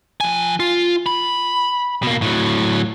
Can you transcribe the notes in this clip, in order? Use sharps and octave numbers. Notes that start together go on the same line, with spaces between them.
F3 G#5
F4
B5
B2 A#3
A2 F#3